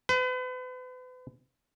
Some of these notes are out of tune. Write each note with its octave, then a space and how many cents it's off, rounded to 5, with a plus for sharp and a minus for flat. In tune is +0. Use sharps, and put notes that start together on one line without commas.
B4 +40